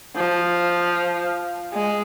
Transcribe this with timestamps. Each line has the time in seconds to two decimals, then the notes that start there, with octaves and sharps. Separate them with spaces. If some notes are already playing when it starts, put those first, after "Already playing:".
0.16 F3
1.73 G#3